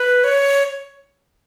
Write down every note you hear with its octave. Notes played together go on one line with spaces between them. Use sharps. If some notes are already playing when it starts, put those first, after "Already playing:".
Already playing: B4
C#5